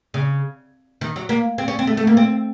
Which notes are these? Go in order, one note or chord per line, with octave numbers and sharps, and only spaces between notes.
C#3
D#3
F#3
A#3
C4
C#4
C4
A3
A3
A#3
C4